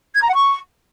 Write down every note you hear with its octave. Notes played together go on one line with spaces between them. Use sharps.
G#6
A#5
F#5
C#6